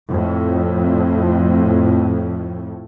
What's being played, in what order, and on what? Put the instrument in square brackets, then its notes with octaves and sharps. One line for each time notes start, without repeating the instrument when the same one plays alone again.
[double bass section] F2 A2